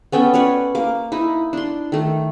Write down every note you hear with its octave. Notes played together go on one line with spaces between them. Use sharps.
B3 C#4 A4 G5
C#4 B4 C#5 D5
A#3 D6
D#4 E4
D4 C6
D#3 A3